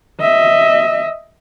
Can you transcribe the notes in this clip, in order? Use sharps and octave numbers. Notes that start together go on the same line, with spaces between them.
D#5 E5